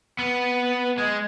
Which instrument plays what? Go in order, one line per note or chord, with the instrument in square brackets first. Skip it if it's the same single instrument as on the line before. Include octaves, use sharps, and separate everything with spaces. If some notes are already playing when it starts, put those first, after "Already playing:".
[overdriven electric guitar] B3
G#3